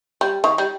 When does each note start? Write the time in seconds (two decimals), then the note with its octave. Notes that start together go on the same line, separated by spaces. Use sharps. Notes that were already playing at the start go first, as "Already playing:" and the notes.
0.21 G3
0.44 D#3
0.58 G3